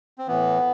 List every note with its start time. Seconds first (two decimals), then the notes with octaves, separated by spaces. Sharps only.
0.18 C4
0.27 A2 E3 B3